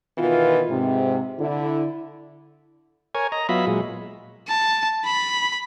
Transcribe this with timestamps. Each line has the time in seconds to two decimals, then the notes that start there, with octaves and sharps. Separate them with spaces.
0.17 B2 D#3 E3 B3 F4
0.69 G#2 C3
1.39 D3 E4
3.15 A#4 C#5 G#5
3.32 D#5 A#5
3.49 F#3 B3 F4 D#5 E5 B5
3.67 A#2 F#3 G#3
4.48 A5
5.05 B5